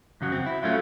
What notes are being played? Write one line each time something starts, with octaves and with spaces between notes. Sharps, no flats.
F#2 C#3 F#3
C4
E4
F#3 A3 C#4 F4